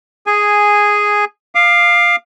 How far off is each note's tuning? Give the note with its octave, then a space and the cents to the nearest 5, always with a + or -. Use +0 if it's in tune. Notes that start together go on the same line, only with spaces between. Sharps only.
G#4 +0 G#5 -5
F5 +0 D6 +35